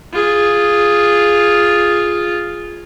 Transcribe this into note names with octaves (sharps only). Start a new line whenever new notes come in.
F4 G#4